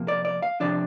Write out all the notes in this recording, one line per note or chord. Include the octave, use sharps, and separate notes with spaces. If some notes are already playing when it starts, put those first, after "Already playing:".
Already playing: C3 F3 A#3
D5
D5
F5
C3 F3 D4 D5